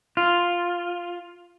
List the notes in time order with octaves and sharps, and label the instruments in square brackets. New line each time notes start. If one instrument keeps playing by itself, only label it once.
[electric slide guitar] F4